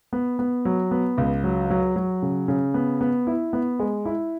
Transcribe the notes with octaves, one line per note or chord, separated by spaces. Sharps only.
B3
B3
F#3
B3
C#2
F#3
F#3
F#3
C#3
C#3
B3
B3
E4
B3
G#3
E4